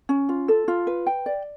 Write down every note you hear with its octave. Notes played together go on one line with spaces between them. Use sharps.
C#4
F4
A4
F4
B4
G5
D5